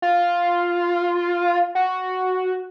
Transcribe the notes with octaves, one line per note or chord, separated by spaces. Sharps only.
F4
F#4